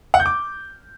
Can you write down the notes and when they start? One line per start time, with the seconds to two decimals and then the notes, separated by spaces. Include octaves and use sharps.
0.14 F#5
0.20 G6
0.26 D6